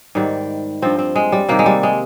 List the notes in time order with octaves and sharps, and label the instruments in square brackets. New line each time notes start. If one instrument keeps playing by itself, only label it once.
[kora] G#2 D#3 G3
G2 F3 C4
C4
G#3
G3
C3 D#3 G3 A#3
G#3
G3
G#3